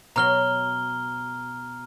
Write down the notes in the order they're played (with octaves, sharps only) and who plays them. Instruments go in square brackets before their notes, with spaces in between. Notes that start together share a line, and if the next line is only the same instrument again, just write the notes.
[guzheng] B2 F#3 [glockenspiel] A#5 F6 G7